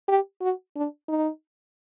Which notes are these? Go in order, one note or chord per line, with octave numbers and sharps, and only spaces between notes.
G4
F#4
D4
D#4